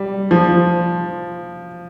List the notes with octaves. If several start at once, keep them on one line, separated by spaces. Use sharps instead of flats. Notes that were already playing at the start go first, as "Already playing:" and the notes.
Already playing: G3
F3